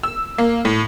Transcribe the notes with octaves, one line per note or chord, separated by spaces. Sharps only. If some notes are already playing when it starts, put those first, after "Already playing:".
E6
A#3
A2